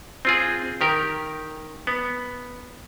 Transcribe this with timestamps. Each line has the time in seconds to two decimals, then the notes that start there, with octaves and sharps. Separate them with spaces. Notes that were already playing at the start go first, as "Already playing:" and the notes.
0.25 C4 F4 G#4
0.81 D#3 G4 A#4
1.87 B3